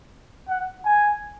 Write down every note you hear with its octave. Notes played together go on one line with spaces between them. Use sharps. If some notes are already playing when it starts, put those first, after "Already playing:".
F#5
G#5